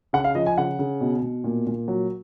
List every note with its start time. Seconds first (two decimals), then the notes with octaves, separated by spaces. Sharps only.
0.13 C#3 F#5
0.24 F5
0.35 F3 D#5
0.46 G#5
0.58 C#3 F#5
0.79 C#3
1.01 B2
1.22 B2
1.44 A#2
1.67 A#2
1.88 F#3